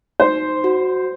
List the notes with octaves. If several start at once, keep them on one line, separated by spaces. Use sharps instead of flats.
D#4 C5
F#4